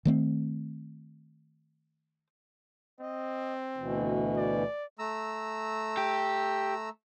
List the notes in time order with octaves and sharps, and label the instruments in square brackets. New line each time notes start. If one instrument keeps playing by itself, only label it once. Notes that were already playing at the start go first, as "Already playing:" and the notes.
[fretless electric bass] D#3 A3 C4
[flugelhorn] C4 [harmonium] D#5
[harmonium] D2 B2 E3
[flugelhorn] D5
[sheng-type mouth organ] A3 A#5 E6
[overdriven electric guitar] G4